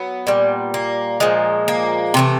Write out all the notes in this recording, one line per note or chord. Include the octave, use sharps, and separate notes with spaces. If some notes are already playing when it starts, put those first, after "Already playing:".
Already playing: F#3 B3
A#2 G3
A#3
A#2 F3 G#3
A#3
C3 E3 A3